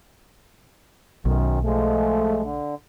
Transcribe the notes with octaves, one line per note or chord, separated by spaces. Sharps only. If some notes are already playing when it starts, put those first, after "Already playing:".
B1 F#2 D#3
F3 G#3 A3
D3